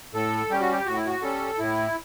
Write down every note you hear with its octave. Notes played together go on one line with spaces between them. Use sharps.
A2 A4
G3 C#4 G4
F#4
G4
A2 F#4
E4
F#4
G3 C#4 A4
A2 E4